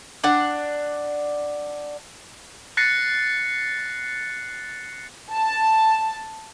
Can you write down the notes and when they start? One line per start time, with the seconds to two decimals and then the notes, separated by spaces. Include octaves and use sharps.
0.24 D4 D5 F#5
2.77 F#6 A6 A#6 C7 C#7
5.34 A5